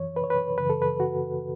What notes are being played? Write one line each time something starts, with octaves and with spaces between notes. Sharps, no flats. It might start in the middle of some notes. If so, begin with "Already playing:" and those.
Already playing: F#2 E3 C#5
B4
C#5
B4
F#2 C#3 E3 B4
A4
B4
F#4